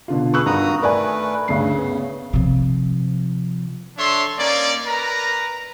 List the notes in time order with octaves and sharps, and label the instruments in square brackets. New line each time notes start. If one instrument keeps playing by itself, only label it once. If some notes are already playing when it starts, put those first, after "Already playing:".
[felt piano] B2 D3 F4
[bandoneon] G#4 B4 [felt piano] C#6 E6 F#6
[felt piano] G2 D#3 [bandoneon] F#4 A#5 D#6
[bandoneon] A3 B4 [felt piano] A#4 D5 G#5
[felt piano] D2 G2 C7 [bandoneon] C#3
[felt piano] B3
[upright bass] C3 F3
[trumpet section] D4 A4 C#5 E5 C6
A#3 C#4 D#4 D5
A#4 B4 A#5